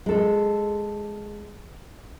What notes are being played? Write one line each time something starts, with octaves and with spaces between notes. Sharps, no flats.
G#3 A4